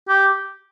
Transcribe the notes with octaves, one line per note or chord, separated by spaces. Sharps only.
G4